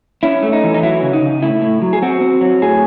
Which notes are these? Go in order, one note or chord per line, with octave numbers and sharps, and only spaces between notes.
C#4 E4
A3
D#4
E3
D#4
F#3 E4
C#3
D#4
C#3
A2 E4
A2
F#3
G#4
C4 F#4
C4
F#3
A2 G#4